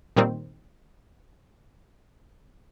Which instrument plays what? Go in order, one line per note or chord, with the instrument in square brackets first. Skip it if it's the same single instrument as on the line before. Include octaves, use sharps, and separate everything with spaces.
[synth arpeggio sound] A#2 D#3 G3 A#3 C4